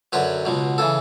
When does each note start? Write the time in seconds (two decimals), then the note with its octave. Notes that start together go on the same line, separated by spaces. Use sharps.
0.13 F#2 D3 F#3 B4
0.45 C#2 B2 F#3
0.78 C#3 E3 A4